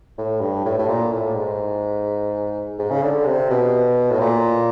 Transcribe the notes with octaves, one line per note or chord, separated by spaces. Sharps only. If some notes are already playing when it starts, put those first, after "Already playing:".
A2
G2
A2
A2
A#2
A2
G#2
G#2
C#3
D3
C3
B2
A2
A#2